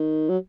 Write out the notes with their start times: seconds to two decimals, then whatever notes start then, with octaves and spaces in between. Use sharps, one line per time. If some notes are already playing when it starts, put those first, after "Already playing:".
Already playing: D#3
0.29 F#3